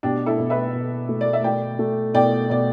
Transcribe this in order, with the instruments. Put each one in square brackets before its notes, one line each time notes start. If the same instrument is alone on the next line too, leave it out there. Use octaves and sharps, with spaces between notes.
[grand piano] B2 [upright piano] D4 G4
[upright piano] E4 A4
[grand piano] B2
[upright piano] B4 E5
[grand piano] B2
A3
[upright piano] D5
E5
[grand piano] A3 [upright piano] D5 G5
[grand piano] A3
[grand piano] B2 [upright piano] D5 G5
[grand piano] B2 [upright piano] D5